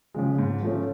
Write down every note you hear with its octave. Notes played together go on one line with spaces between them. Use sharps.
C#3 F3 G#3
G#2
F3 A3 C#4